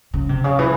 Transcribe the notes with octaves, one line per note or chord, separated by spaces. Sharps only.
C#3
C3
C#3
E3